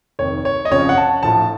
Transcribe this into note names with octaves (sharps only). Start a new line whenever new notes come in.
F1 F2 D#3 C#5
C#5
D#5
F#1 F2 C#3 F3 C#5
F#5
A5
A#1 A2 F3 A5